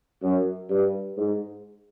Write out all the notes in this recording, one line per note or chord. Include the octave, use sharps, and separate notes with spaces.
F#2
G2
G#2